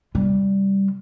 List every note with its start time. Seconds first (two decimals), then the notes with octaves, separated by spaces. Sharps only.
0.15 C3 G3